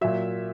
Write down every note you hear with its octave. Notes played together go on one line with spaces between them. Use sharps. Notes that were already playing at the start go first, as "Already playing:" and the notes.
A#2 F#3 E5